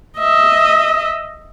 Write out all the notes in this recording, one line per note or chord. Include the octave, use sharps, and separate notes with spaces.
D#5 E5